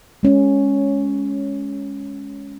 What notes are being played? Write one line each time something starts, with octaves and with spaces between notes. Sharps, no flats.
G#3 C#4